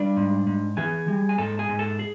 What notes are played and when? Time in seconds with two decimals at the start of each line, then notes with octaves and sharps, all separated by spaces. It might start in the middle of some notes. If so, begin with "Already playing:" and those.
Already playing: G3 D4 D5
0.16 G#2
0.47 G#2
0.77 E3 G#4 G#5
1.08 G3
1.29 G#5
1.38 G#2 A4 A5
1.59 G#4 G#5
1.69 G#2
1.79 A4 A5
1.99 G#4